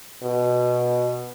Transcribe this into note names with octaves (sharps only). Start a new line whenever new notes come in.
B2